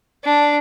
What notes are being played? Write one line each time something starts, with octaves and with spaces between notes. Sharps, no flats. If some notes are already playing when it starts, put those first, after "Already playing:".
D4